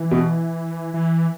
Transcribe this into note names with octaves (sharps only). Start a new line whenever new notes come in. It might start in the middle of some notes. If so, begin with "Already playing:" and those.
Already playing: E3
B2
E3